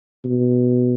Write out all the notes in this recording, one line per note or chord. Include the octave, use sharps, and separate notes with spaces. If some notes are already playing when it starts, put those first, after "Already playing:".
B2